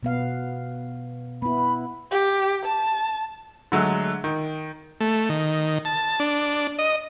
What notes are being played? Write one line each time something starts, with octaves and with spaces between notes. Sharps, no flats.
B2 B3 F5
B3 E4 B5
G4
A5
D3 F#3 G#3 A3
D#3
A3
D#3
A5
D4
D#5